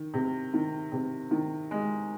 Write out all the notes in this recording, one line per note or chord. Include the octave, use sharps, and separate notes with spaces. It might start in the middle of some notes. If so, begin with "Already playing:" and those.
Already playing: D#3
C3
D#3
C3
D#3
G#3